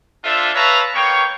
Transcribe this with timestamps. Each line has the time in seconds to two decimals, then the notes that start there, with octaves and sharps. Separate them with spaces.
0.24 D4 F4 A4 C5 E5
0.55 B4 C#5 E5 F5 A5 A#5
0.94 A#3 B3 C#5 G5 C#6